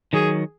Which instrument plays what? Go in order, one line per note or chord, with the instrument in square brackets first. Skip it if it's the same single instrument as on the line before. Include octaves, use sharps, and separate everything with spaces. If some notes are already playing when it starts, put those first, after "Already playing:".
[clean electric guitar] D#3 F#3 [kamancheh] G#4